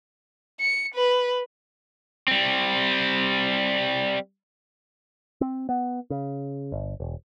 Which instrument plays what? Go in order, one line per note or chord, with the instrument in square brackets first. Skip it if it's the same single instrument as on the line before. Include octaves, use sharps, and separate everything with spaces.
[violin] C#7
B4
[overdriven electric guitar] G3 C4
[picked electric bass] C4
B3
C#3
G1
E1